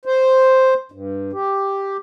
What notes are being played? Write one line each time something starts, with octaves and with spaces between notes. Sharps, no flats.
C5
G2
G4